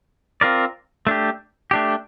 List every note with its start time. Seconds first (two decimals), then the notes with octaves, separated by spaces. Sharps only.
0.41 C4 F4 A#4 D5
1.07 A3 D4 G4
1.71 A3 D4 G4